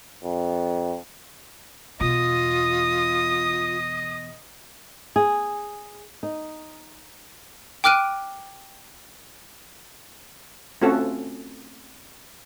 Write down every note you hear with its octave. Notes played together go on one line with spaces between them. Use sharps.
F2
E2 B2 F4 D#5 D#6
G#4
D#4
G5 D6 F6 F#6 D7 D#7
A3 C4 C#4 F4 F#4 A4